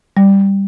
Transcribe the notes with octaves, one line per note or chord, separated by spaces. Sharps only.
G3